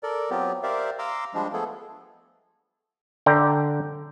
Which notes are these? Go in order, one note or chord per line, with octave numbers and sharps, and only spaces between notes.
A4 A#4 D5
F#3 B3 C4 F4 G4
G4 A#4 C5 D5 E5 F5
F5 A#5 C6 D6 E6
F3 G3 G#3 D4
F3 A3 B3 G#4 A4
D3 D5 G5 A#5